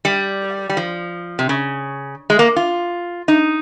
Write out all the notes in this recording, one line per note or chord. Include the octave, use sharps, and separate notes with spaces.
G3
G3
F3
C3
C#3
G#3
A#3
F4
D#4